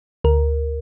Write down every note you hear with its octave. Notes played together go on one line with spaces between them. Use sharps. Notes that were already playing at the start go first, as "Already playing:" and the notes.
D2 A#4